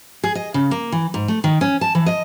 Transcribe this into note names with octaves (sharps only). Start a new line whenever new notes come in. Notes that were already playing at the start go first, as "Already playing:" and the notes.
G#4
D#5
C#3
A#3
E3
G#2
A3
D#3
C#4
A5
E3
D#5